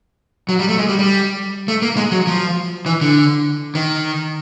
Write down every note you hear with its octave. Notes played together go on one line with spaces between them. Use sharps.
F#3
G3
A3
G#3
G3
G3
A3
A#3
G#3
F#3
F3
E3
D3
D#3